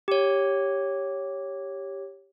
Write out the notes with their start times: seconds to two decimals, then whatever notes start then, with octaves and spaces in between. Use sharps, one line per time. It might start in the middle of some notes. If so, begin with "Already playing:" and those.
0.08 G4 C#5